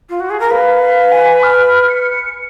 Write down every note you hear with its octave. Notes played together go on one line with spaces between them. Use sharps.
F4
F#4
G#4
A#4
B4 F5
F5
G#5
F6
C#7